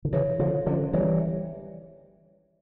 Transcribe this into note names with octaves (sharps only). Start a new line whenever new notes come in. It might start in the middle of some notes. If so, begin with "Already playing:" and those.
D3
C#3 E3 C#5
D3 F3 C#5
D3 F3 C#4
E3 G3 C#5
E5